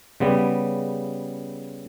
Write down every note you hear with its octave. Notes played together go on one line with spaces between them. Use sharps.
C#3 G3 B3